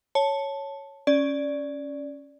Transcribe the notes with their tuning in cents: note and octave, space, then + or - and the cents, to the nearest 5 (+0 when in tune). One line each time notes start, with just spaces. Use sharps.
C#5 +0 A5 +0
C#4 +0 D5 -5